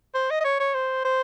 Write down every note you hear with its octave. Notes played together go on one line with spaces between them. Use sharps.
C5
D#5
D#5
C#5
C#5
C5
C5